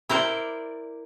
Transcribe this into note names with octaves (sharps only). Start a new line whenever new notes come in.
E4 A#4 C5 D5